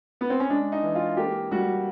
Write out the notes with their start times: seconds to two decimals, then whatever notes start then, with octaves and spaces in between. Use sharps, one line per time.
0.21 B3
0.30 C4
0.40 C#4
0.50 G#3 D4
0.72 D#4
0.83 E3
0.95 F4
1.17 A#3 G4
1.51 G3 F#4